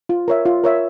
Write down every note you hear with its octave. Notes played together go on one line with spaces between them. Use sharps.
F4
A#4 C#5 E5
F4
A#4 C#5 E5